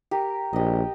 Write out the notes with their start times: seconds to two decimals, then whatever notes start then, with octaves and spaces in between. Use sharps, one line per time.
0.11 G4 A#4
0.53 A#1 G4 D#5